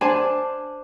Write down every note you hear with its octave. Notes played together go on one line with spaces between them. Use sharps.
D4 C5 D5 G#5 A5